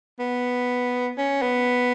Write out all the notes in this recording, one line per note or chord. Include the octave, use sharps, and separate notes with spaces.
B3
C#4
B3